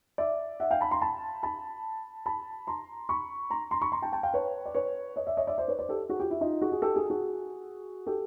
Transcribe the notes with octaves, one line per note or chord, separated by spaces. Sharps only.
D5 E5
E5 F#5
F5 G5
A5 B5
A#5 C6
A5 B5
A5 B5
A5 B5
A#5 C6
B5 C#6
A#5 C6
A#5 C6
B5 C#6
A#5 C6
G5 A5
G5 A5
F5 G5
B4 C#5
D5
B4 C#5
C#5 D#5
D5 E5
C#5 D#5
D5 E5
C5 D5
B4 C#5
C5 D5
G4 A4
F#4 G#4
F4 G4
E4
D#4 F4
F#4 G#4
G#4
G4 A4
F#4 G#4
F#4 G#4
G4 A4